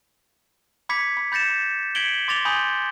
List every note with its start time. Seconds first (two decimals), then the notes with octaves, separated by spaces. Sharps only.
0.89 B5 D6 G#6 B6 C#7
1.17 B5
1.32 B5 G6 A6 A#6 C#7 E7
1.95 G#6 B6 C#7 D7 F#7 G7
2.28 C6 D6 A6 A#6 F7 G7
2.45 G#5 B5 C6 D#6 G6